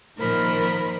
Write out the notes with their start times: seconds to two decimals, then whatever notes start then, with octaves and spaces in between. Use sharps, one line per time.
0.18 A#2 D#3 F3 A#4 C5 B5